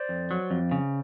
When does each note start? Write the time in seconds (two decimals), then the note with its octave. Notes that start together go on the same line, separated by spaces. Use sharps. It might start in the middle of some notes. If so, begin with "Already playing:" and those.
Already playing: C5 D5
0.09 F2
0.31 F#3
0.51 F2
0.71 C#3